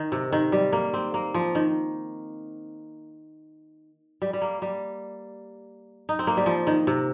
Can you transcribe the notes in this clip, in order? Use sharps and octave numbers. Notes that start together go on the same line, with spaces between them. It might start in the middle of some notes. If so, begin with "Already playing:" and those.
Already playing: D#3
C3
D#3
G3
A#3
C4
A#3
F3
D#3
G3
G3
A#3
G3
D#4
C4
A#3
G3
F3
D#3
C3